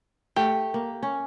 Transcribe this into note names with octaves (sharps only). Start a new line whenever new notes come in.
A3 G4 F#5
A#3
C#4